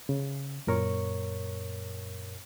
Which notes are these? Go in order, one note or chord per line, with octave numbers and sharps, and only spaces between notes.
C#3
F#2 A#2 A#4 C#5 C#6